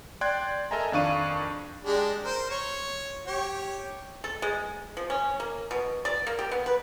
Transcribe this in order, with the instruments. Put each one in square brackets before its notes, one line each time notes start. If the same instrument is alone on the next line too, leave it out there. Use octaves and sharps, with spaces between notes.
[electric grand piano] D5 G5 C6 F#6 G#6
A4 A#4 D#5 E5 G#5 A#5
F2 D#3 D4 F5 C#6 D#7
[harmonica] G#3 D4 G4
A#4 C5
C#5
G4 C#5
[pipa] A4
G#3
F3
C#4
A#3
B2
D5
A#3
G4
B3
B4